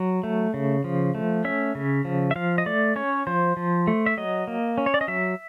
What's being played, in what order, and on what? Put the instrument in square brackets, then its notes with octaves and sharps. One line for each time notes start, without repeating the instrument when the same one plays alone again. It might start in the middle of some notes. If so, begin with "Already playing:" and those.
Already playing: [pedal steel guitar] F#3
A3
C#3
F3
A3
C#4 E5
C#3
F3
E5
F3 F5
D#5
A3 D5
C#4 C#5
F3 C5
F3
A3
E5
F#3 D#5
A#3
C#4
C#5
D5
D#5
F#3 E5